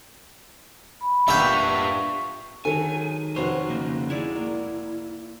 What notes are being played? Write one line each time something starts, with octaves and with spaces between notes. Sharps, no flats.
B5
A#2 G3 B3 D4 E5 F5 G5 C#6
D#3 F#3 G#3 A4 G#5
F1 F#4 C5 C#5
C#3 A#3
G#3 E4 D5
A#3